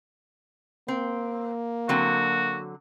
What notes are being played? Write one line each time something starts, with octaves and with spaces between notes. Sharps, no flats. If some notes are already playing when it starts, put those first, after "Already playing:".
A#3 C4
D3 F#3 C4 F#4